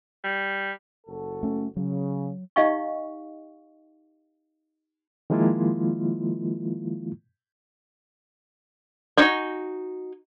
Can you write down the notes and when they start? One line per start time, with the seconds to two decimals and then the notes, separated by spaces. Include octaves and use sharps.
0.24 G3
1.07 F#1 F#4 A4
1.43 A3 C#4
1.77 C#3 F#3
2.56 D#4 G4 D#5 F5 G5 C#6
5.30 D#3 F3 G#3 A#3 E4 F4
9.18 D#4 F#4 G5 G#5